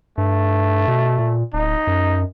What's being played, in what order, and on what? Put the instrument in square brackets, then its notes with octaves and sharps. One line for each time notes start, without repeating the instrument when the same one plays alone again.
[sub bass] G2 [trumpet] A3
[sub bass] B2
A#2
[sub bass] D1 [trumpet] D#4
[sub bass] F#2